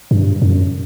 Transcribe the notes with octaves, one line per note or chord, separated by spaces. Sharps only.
G2
F#2